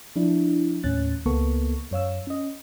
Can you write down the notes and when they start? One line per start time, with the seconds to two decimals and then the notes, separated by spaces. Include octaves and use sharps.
0.16 F3 D4 E4
0.84 D#2 A2 C#4 F#6 A6
1.26 C#2 A#3 B3 A4 C#6
1.91 F#2 C#5 F5 E6
2.27 C#4 D#5